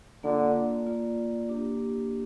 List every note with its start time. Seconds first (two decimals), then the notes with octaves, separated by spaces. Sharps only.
0.23 D3 A#3 F4 D5
0.86 A#3 F4 D5
1.49 A#3 D4 G4